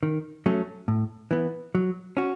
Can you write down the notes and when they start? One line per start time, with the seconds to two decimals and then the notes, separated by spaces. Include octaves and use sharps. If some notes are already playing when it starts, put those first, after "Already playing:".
0.03 D#3
0.46 F#3 A3 C#4
0.88 A2
1.31 E3 B3
1.75 F#3
2.17 C#4 F#4